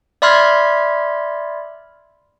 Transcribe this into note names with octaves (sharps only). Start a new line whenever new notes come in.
D5 E5 B5 C6 F6 G#6